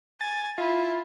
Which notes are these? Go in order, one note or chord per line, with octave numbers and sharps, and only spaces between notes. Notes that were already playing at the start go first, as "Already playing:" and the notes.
G#5 A6
E4 F4